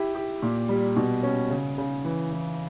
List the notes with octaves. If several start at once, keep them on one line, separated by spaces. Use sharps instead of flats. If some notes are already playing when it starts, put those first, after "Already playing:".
Already playing: E4 G4
G4
A#2
G3
B2
C#4
C#3
C#3
E3
E3